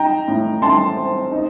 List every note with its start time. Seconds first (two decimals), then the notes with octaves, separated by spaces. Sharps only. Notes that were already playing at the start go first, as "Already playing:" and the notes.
Already playing: D#4 G5 A#5
0.28 A2
0.62 A3 A5 C6
0.96 C4
1.32 D#4